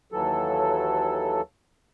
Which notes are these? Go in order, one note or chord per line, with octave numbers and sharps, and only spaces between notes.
D#2 E3 F#3 A4